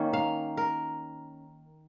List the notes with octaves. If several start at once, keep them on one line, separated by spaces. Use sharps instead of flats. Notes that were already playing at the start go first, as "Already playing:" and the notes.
Already playing: D#3 A#3 C#4
F5
A#4